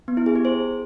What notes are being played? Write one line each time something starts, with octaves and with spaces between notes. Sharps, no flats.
B3
E4
G#4
G4
C5